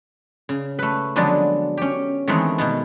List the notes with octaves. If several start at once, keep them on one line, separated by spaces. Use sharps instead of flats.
C#3
A3 B4
D3 F3 F#3 G#3 B3 D4
C#4 G4
D#3 E3 G#3 A3 B3 C4
B2 D#3 B3